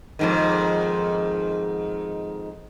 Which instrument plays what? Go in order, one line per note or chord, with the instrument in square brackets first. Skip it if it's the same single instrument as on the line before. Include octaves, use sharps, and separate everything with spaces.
[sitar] F2 G#2 D#3